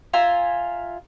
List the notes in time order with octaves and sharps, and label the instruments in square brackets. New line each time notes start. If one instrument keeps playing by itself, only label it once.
[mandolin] F4 E5 G#5 A#5